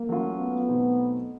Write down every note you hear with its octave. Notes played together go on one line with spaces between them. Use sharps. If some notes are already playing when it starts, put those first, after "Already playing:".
Already playing: A#3
F#3 A3 C#4 F4
B3
B2 F#3 A3 C4 D#4